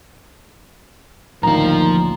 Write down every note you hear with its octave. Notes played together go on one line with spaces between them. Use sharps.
A1 D2 A#2 D#3 F3 F5 A#5